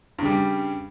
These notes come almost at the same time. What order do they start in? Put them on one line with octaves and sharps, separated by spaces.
G2 C#3 G3